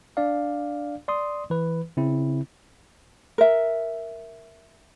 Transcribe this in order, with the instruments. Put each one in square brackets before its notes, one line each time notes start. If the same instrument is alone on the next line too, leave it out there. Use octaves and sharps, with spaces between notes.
[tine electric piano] D4 D5 F5
D5 C6 D#6
E3 B4
C#3 C4 E4
[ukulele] A#4 E5